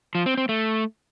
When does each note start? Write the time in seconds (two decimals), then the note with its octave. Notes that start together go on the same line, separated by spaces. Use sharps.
0.15 F3
0.26 C4
0.37 C4
0.49 A3